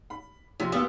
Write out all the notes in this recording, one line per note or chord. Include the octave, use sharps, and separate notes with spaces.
B5
A#1 C3
D2 A#3 B3 F4 G4 E6